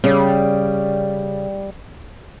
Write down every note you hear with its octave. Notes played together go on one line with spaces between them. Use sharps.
C#3 G3